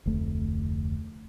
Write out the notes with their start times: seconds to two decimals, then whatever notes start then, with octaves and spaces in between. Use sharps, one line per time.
0.06 F1 D2 A3